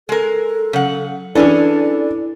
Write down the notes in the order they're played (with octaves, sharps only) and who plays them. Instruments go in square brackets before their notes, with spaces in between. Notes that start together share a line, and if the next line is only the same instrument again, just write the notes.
[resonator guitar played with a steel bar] G#3 A#4 [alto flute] A4
[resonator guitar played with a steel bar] C#3 F#5 [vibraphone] F#3
[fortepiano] E3 D4 [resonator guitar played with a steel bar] C#4 G#4 A4 [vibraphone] E4 [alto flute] D5